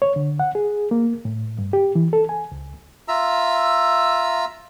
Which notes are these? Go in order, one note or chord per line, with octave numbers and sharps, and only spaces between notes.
C#5
D3
F#5
G#4
A#3
A2
G2
G4
E3
A4
G#5
C#2
F4 E5 A#5 E6